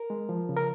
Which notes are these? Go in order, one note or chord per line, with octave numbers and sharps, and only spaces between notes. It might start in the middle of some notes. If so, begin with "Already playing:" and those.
Already playing: A#4
G#3
F3
C#3
A#4